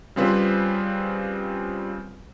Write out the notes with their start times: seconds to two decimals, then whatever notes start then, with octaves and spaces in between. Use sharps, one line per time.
0.16 C#3 G3 C4 F4 B4 C5